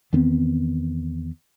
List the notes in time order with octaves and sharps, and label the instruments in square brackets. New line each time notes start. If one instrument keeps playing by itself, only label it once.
[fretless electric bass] E2 D#3 B3 C4